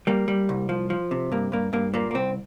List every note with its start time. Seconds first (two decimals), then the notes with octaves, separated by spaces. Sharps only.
0.07 G3 A#3
0.28 G3
0.49 C2
0.69 F3
0.90 F3
1.11 C3
1.32 G2 A#3
1.52 G2 A#3
1.73 G2 A#3
1.94 A#2 A#3
2.11 A#3
2.14 C2 C4